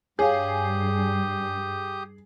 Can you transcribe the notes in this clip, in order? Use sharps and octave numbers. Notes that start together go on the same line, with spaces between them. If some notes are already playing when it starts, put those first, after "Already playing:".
G2 G4 G#4 C#5 F5 D#6 G6